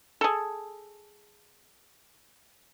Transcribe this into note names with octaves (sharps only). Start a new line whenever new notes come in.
G#4 A4